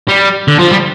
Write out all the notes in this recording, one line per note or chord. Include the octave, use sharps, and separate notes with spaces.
G3
D3
F3
G3